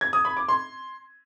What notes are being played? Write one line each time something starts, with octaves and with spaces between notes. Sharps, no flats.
G#6
D#6
B5
D6
C6